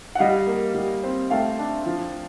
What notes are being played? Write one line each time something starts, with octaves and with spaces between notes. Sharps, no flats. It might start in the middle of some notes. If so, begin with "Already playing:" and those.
F#5
G3 D#5 F5
A#3
G3
C4
A3 F5 G5
D4
F3